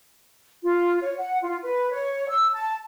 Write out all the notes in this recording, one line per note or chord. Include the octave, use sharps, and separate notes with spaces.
F4
C#5
F#5
F4
B4
C#5
E6
A5